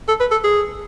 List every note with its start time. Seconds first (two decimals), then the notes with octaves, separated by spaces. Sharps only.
0.08 A4
0.20 B4
0.31 A4
0.44 G#4